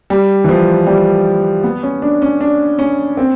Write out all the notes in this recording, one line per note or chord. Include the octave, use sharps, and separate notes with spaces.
G3
E3
F3
G3
B3
C#4
D4
C#4
D4
C#4
C4